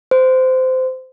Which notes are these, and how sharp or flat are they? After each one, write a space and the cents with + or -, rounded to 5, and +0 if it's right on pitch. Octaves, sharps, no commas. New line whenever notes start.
C5 -20